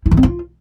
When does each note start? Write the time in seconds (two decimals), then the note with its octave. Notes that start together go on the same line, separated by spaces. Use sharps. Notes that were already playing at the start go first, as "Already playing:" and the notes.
0.06 E4
0.11 E3
0.17 C4
0.23 F4